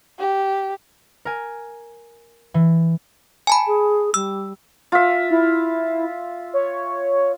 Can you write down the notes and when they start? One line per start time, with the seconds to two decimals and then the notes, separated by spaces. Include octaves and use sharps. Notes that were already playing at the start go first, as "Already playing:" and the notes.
0.19 G4
1.25 A#4 G#5
2.54 E3
3.47 G#5 A5 B5
3.66 G#4
4.14 G3 E6
4.92 F4 E5
5.30 E4
6.54 C#5